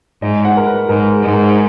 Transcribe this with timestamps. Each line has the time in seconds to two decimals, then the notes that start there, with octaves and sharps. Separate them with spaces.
0.22 G#2 D#5
0.45 F#5
0.57 A#4
0.67 B4
0.89 G#2 A#4
1.11 G#4
1.23 G#2
1.33 A#4